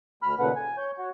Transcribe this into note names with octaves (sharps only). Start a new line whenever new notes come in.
D2 B5 F6
D#2 A#2 C#3 A3 B4 F#5
G#5
C#5 G6
F#4 C#5